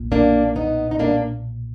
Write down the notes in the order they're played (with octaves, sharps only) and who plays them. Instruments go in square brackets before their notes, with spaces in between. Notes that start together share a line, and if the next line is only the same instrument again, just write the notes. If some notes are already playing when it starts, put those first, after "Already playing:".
Already playing: [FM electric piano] B1 A#2
[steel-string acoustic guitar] A#3 D4
B3 D#4
D#4
A#3 D4